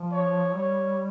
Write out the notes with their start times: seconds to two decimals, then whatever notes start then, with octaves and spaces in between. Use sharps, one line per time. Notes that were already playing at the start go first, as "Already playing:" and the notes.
Already playing: F3
0.11 C#5
0.55 G3 C#5